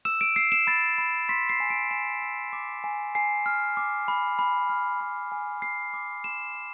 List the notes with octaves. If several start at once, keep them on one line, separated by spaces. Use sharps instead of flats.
E6 E7
D7
E6 C7
E7
B5 A6
B5
C6 B6
C7
G#5
D7
G#5 E7
E6
D6
G#5
G#5 C7
F6
D6
B5
B5
F6
B5
G#5
G#5 C7
D6
C6 E7
G#5